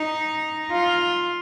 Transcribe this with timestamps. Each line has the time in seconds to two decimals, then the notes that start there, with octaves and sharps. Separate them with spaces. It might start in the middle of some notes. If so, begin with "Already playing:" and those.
Already playing: D#4
0.72 F4